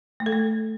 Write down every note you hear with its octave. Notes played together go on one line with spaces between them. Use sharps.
A3
A4
A3